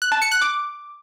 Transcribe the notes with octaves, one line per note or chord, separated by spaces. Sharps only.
F#6
A5
C#7
F#6
D6